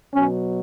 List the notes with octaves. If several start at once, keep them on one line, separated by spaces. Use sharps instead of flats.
B2 F#3 C#4